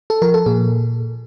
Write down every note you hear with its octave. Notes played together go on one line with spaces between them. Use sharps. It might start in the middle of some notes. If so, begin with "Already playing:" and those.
A4
F3 A#4
A4
A#2 G#4